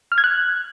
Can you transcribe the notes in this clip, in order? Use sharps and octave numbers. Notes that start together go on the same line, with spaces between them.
F6
G#6
F#6